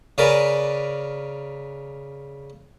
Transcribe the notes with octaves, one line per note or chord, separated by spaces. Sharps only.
C#3 A#4 B4 D5 G#5 B5